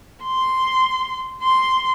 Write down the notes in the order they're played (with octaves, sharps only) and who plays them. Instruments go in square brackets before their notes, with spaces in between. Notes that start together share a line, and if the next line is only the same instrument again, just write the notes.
[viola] C6
C6